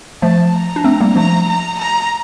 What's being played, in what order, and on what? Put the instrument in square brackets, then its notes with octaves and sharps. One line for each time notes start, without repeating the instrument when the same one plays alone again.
[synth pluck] F3 A3 [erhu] A5
[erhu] A#5
[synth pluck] D4
A3 C4
G3 A#3
[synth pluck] F3 A3 [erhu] A#5
[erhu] A#5
A#5